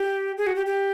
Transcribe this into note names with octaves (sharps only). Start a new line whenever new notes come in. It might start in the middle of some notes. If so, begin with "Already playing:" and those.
Already playing: G4
G#4
F#4
G4
G4